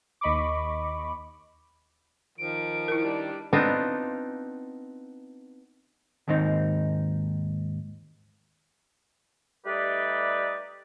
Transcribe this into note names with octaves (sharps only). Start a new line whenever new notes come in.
D#2 D#5 B5 C#6 D6
D#3 F3 D7
E4 A#4
G3 D4
B3 C4 D4 D#4 F4
D#2 G#2 D#3 C4 D#4
G3 A3 D#4 G4 B4 D5